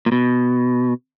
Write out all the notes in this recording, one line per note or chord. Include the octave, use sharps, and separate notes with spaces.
A#2
B2